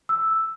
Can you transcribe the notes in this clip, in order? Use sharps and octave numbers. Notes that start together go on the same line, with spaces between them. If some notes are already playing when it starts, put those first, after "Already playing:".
E6